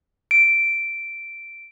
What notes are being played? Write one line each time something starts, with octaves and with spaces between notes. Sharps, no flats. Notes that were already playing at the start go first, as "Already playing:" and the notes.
D7